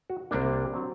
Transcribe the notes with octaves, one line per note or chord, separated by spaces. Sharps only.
F#4
C2 C3 G3 A#3 D4
F#3 C4